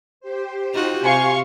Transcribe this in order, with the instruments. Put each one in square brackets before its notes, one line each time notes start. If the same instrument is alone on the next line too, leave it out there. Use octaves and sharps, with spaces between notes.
[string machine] G4 C5
[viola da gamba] D#4 F4 F#4
[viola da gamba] C3 [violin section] F5 C6 C#6 [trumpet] G#5